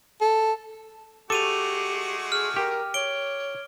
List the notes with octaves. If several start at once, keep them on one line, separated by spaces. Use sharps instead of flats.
A4
G#3 A3 F#4 G4 A4 D6 D#7 F7
G#4 F6
G4 A#4
C#5 D7 G7